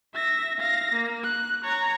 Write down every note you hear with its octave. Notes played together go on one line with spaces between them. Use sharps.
E5 A#6
F5 A#6
A#3
F#6
C#5 A#5